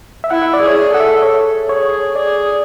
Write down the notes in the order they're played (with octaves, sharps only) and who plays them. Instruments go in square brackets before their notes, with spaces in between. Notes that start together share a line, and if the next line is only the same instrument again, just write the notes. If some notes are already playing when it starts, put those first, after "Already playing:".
[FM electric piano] E5
[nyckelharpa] E4 [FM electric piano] F#5
[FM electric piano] E5
D5
[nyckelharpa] G#4
[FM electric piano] C#5
D5
[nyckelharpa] A4 [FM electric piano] F#5
[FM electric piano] E5
C#5
[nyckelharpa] G#4 [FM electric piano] C#5
[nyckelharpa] G#4 [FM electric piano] D5